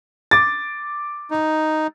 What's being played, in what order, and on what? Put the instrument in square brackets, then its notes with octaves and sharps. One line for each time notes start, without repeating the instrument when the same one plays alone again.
[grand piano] D6 A6
[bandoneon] D#4